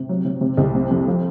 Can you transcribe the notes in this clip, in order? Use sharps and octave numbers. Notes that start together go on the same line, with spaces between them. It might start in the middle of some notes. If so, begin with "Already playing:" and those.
Already playing: C3
F#3
C3
C3
C2
C3
F2
F3